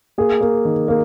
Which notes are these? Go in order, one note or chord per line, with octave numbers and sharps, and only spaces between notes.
A#3 G#4
A#3
D#3
A#3